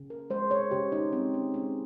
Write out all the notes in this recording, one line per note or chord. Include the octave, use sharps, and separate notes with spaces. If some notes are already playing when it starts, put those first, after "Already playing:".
Already playing: C#3
A#4
G#3 C5
C#5
C#3 G4
D#4
G#3 C4
C#4
G#3 C#4